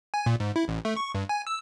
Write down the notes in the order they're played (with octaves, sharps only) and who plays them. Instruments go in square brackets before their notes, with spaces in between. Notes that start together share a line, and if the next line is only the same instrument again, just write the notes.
[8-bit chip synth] G#5
A#2
G#2
E4
A1
A3
C#6
G2
G#5
E6